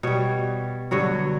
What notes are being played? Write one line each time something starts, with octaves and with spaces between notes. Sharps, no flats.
B2 G3 C#5
G2 D3 F#3 C#5